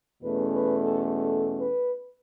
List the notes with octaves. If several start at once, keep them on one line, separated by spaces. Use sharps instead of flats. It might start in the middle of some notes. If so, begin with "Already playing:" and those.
E2 B2 A3 C#4 B4
B4
A4
A4
B4